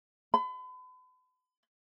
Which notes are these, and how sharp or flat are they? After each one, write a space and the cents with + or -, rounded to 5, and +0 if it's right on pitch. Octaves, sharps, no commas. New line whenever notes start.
B5 +40